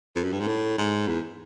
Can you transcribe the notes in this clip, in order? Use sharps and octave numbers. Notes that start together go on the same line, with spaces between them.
F2
F#2
G2
G#2
A2
G#2
E2